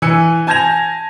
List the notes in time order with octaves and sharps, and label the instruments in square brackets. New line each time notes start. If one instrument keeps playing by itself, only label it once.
[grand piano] E3 G#5 E6 C#7
G#5 A5 G6 G#6 A#6 F7